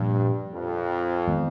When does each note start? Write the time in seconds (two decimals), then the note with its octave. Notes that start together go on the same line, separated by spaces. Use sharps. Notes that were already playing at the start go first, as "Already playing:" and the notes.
Already playing: G2 A#2 F3 A#3
0.52 F2
1.28 D#3 G#3 B3